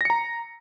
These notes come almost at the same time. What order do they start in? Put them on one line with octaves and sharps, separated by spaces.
A#6 C#7 A#5